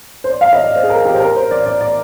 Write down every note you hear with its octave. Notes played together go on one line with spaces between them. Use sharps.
C5
D5
F5
D#5
D5
C5
G#4
A#4
G4
C5
A#4
C5
D5
D5
D5